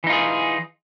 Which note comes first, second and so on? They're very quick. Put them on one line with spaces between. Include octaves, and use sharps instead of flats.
E3 D#4 F4 G#4